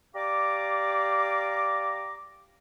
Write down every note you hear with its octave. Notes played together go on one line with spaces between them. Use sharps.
G4 D5 F5 A#5 D6